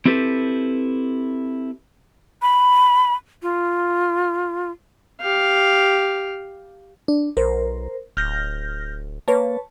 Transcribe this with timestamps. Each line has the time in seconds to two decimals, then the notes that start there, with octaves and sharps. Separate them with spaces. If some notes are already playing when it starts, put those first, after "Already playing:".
0.05 C4 E4 G4 A4 B4
2.42 B5
3.42 F4
5.21 G4 F5
7.08 D4
7.37 B1 A#4 C5
8.17 D1 F6 G6 A#6
9.28 A#3 B4 C#5 A5